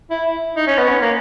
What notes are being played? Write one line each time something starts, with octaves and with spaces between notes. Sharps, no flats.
E4
D#4
C#4
B3
C#4
A#3